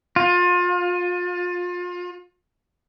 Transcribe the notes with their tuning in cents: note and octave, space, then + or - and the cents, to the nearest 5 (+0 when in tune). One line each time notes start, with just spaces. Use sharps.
F4 +30